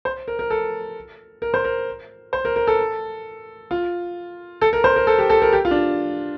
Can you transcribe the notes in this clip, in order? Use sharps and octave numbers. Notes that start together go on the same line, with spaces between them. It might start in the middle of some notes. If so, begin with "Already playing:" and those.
C5
A#4
A#4
A4
A#4
C5
A#4
C5
A#4
A#4
A4
F4
A4
A#4
C5
A#4
A4
G4
A4
A#4
G4
F4
D4